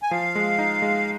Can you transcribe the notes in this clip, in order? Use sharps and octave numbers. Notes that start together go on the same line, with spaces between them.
G#5
F3 F5
G#3
D#4
G#3